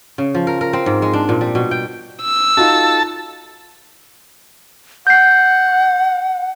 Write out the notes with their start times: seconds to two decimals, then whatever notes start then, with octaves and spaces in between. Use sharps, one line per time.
0.18 C#3
0.34 F3
0.47 A#4
0.61 A#4
0.73 C4
0.86 G#2
1.02 G#3
1.13 D4
1.29 A#2
1.41 G3
1.55 B2
1.71 G5
2.22 E6
2.57 D#4 F4 F#4 A4 A5
5.07 F#5 G6 C7